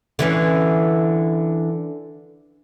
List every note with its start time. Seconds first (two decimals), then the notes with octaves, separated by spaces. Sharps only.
0.19 D3 E3 C#4